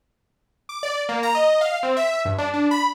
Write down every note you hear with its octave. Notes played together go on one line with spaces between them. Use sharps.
D6
D5
A#3
A#5
D#5
F5
C4
E5
G2
D4
D4
B5